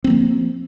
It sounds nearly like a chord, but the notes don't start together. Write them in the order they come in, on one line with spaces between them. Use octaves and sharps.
C4 A#3 F3